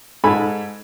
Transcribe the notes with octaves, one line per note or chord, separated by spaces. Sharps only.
G#2 A4 G#5 B5